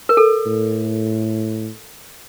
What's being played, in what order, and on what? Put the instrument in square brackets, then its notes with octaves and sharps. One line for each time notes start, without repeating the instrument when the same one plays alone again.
[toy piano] A#4
A4
[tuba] A2